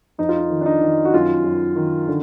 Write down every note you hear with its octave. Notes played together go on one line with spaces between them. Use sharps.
F2 D#4
F4
D#4
D#3
D4
D#4
D#3
F#4
F#2 F4
F#2
D#3
D3